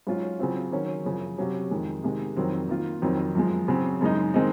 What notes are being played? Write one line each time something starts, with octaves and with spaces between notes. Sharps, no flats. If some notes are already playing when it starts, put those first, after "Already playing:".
G#2 F#3 C#4 F4
C#3 F#3 C4 F4
D#3 F#3 C#4
F#2 C#3 F3
C3 F#3 C#4
F2 D#3 G#3
C3 D#3 G#3
F2 D#3 F#3 C4
D#3 A#3 F4
F2 D#3 F#3 C4
F#2 F3 G#3
C#3 F#3 C4
F#2 C#3 G#3 D#4
D#3 G#3 C4 D#4